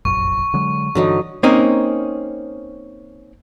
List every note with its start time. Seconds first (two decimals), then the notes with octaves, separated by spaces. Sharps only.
0.05 F1 A#1 F#2 C#6
0.54 D3 F#3 G#3
0.95 G2 D3 E3 F#3 D#4
1.43 A#3 C4 C#4 D#4